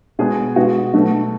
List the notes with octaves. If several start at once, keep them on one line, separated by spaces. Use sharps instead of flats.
B2 G#3 B3 G#4
B2 G#3 B3 F#4
B2 F#3 A3